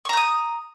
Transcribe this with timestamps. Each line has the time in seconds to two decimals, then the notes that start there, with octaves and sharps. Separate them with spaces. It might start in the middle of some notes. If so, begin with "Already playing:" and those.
0.05 C#6
0.09 A#5
0.13 G6
0.17 D#6